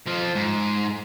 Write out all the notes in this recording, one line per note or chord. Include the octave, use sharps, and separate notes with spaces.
F2 F3
G#2